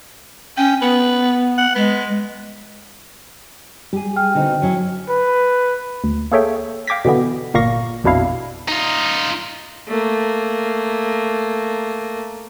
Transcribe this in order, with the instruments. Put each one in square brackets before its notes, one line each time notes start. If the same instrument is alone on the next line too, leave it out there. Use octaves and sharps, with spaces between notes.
[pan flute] C#4 [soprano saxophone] G5
[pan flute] B3 [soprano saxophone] B4
[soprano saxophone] F#5
[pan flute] G#3 [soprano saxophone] B3
[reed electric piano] G3 [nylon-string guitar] G4 G#4
[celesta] G5 F6
[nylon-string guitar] B2 C4 D#4 [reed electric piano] D3
[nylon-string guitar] F#3 C#4 E4
[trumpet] B4
[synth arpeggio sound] D2
A#3 G#4 A4 C#5 E5 G5
F5 G5 D6 G#6 A#6 B6
B2 D3 E3 B3
G1 A#2 A#3 F5 C#6 A#6
A#1 F2 B2 D4 E4 F5
[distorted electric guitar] D#4 F4
[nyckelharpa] A3 A#3